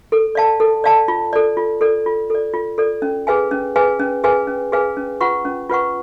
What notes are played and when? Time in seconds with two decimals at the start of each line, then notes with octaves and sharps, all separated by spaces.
0.12 A4
0.35 D5 F5 A5
0.60 A4
0.84 D5 F5 A5
1.08 F4
1.33 A4 D5
1.57 F4
1.81 A4 D5
2.06 F4
2.30 A4 D5
2.54 F4
2.78 A4 D5
3.02 C#4
3.27 G#4 B4 F5 G#5
3.51 C#4
3.76 G#4 B4 F5 G#5
3.99 C#4
4.24 G#4 B4 F5 G#5
4.47 C#4
4.72 G#4 B4 F5 G#5
4.97 C#4
5.21 F4 B4 F#5 C#6
5.45 C#4
5.70 F4 B4 F#5 C#6